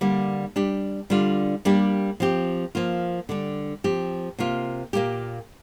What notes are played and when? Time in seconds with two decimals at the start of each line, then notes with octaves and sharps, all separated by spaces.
0.01 D3 G3 A#3
0.56 G3 D4 G4
1.10 D3 G3 D4 F4
1.65 G3 A#3 D4 G4
2.20 F3 C4 G4
2.75 F3 A#3 F4
3.29 D3 G3 D4
3.84 F3 C4 G4
4.39 C3 A#3 F4
4.93 A#2 A#3 G4